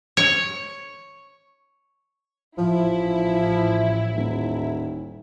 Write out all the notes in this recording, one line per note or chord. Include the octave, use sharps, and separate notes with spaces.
C#5
A1 F3 E4
D#1